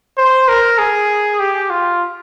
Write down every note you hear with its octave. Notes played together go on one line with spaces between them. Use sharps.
C5
A#4
G#4
G4
F4